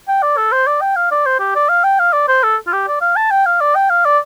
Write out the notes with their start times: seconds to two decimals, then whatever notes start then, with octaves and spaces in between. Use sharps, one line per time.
0.08 G5
0.22 D5
0.37 A4
0.52 C5
0.67 D5
0.81 G5
0.96 F5
1.11 D5
1.26 C5
1.40 G4
1.55 D5
1.69 F5
1.84 G5
1.99 F5
2.13 D5
2.28 C5
2.43 A4
2.67 F4
2.73 G4
2.88 D5
3.01 F5
3.16 A5
3.31 G5
3.46 F5
3.61 D5
3.75 G5
3.90 F5
4.05 D5